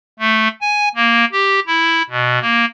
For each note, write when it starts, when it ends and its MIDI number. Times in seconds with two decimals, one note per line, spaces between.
0.19 0.48 57
0.61 0.89 80
0.95 1.25 58
1.32 1.60 67
1.67 2.02 64
2.09 2.39 47
2.41 2.65 58